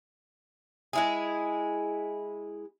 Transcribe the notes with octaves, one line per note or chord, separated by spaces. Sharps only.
G#3 E4 G#4